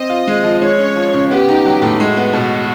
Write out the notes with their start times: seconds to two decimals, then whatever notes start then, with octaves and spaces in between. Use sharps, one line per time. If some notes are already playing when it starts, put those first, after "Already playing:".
Already playing: C4 D#5
0.10 F4
0.28 G#3
0.44 F3
0.62 G#3 C#5
0.79 C#4
0.95 F3
1.14 C#3
1.31 B3 G4
1.48 D#4
1.66 F#3
1.82 A2
1.99 G#3 F#4
2.17 B3
2.33 B2